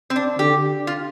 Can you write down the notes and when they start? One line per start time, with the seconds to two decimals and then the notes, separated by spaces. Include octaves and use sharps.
0.10 C4
0.16 D4
0.39 D3 G4
0.87 F4